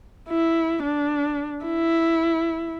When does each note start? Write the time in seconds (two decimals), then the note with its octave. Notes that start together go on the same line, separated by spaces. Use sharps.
0.29 E4
0.83 D4
1.66 E4